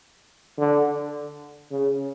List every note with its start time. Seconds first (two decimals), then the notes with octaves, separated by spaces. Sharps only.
0.58 D3
1.71 C#3